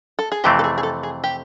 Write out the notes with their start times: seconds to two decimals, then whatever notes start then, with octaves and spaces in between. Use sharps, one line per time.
0.19 A4
0.32 G#4
0.44 F2 C3 E3 A3 C4 G4
0.59 A4
0.64 G#4
0.78 G#4
0.83 A4
1.03 G#4
1.24 G4